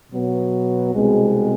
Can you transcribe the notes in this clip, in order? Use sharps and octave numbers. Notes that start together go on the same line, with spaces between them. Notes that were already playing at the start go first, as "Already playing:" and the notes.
B2 F#3 B3
C2 B2 G#3 C4